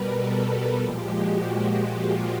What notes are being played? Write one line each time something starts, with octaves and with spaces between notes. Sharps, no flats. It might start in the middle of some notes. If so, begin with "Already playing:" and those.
Already playing: B2 G3 A#4 B4
A4
A4
A#2 F3 G#3 G4
F#4
F4